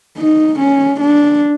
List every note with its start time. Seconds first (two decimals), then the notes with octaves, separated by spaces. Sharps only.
0.18 D#4
0.60 C#4
1.01 D4